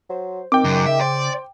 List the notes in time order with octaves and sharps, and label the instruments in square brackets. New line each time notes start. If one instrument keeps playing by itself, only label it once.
[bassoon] F#3 [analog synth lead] C5
[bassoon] D#3 [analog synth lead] C4 [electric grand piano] G5 D6
[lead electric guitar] F#2 [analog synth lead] C#3
[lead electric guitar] E5
[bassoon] C5 [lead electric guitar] D5